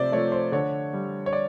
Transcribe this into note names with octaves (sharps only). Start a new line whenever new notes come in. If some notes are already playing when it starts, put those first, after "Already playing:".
Already playing: C3 F3 A3 C5 D5
F3 A3 C#5
C5
D3 C#5
G3
C#5
D5